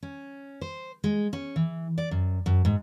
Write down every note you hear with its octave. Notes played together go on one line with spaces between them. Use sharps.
C#4
C5
G#3
C#4
E3
D5
F#2
F#2
G#2